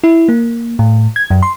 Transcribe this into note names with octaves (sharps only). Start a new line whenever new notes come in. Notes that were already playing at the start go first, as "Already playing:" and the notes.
E4
A#3
A2
G#6
F#2
C6